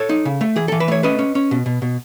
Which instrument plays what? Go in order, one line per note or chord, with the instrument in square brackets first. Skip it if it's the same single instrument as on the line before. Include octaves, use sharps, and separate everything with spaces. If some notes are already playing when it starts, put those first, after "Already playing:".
Already playing: [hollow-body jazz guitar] A4 C#5
D#4
C#3
A3
E3 G#4
E3 A4
B4
A3 C#5
C#4 B4 D#5
C#4
C#4
B2
B2
B2